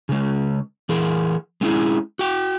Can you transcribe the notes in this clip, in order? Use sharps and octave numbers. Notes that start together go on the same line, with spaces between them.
C#3 G#3
E3 G#4 A#4
G#3 A3 C#4 E4 G#4
F#4 G5